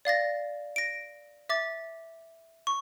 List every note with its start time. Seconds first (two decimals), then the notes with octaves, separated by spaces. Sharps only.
0.05 D5 F5 A6 A#6
0.76 A#6 D7
1.49 E5 D6 A6
2.67 C#6